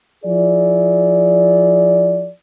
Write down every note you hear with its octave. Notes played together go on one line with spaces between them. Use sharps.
F3 E4 G#4 D5